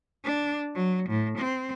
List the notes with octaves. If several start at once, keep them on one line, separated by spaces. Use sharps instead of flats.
D4
F#3
A2
C4